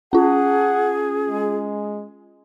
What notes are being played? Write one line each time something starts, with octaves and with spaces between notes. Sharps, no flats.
C#4 F4 G#4 F#5
G#3